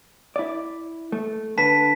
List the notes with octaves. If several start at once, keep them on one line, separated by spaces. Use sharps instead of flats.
E4 D5
A3
D3 B4 A5 B6